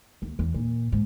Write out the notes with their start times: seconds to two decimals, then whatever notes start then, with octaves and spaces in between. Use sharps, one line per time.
0.22 D#2
0.39 E2
0.54 A#2
0.92 G#2